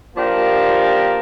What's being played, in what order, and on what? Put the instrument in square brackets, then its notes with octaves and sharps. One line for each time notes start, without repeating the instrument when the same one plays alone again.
[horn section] F3 A#3 D4 G4 A#4